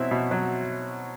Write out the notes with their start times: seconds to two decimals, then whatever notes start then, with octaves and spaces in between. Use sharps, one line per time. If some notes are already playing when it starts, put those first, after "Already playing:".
Already playing: B2 F#3 C4 E4 E5
0.11 B2
0.31 F#3